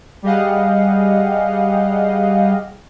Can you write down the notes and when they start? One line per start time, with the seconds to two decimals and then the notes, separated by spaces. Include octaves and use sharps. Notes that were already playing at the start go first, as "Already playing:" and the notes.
0.22 G3 G4 G#4 D#5 F5 F#5